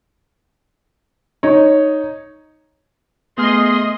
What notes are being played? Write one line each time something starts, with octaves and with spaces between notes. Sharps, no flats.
D#4 C#5
A3 B3 G#4 D#5 C6 F6